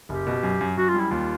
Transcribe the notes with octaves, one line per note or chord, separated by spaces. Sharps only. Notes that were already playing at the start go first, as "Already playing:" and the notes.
F#1 G4
B2
F#2
F#2
F#2 F#4
F4
G3
E4
D#2 F4